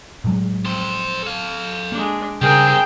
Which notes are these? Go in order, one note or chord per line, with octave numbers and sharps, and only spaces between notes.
A2 F#3 G#3
F2 C5
A4 F5
G#3 A#3 D4
G2 C#3 C4 G#4 A#4 G5